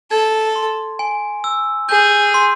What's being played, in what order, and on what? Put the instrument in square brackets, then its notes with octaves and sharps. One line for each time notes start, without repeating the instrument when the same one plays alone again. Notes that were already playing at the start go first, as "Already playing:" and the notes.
[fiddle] A4 [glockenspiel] G#6
[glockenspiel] C6
G#5
E6
[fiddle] G#4 [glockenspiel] G6
[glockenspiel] C6